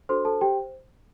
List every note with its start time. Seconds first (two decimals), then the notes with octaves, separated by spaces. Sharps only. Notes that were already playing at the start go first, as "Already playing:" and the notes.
0.09 D4 F#4 A4 C5 C6
0.25 A4 A5
0.41 G4 C5 G5